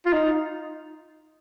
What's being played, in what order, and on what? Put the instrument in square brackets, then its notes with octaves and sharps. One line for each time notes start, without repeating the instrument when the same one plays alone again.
[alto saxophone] F4
D#4